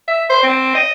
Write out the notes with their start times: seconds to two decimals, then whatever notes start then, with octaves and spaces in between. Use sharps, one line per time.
0.08 E5
0.30 C5
0.43 C4
0.75 D#5